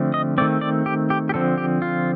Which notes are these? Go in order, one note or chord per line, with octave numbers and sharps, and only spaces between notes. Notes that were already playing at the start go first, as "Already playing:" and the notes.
Already playing: D3 F3 A3 C4
D#5
D#3 A3 C4 D5
D5
G4
G4
G4
D3 F3 C4 A4
G4
F4